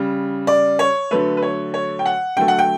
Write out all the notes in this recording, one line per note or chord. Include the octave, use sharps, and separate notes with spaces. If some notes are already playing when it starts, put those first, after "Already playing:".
Already playing: C#3 G3
D5
C#5
D3 F#3 A3 B4
B4
C#5
C#5
G5
F#5
D3 F#3 A3 G5
F#5
G5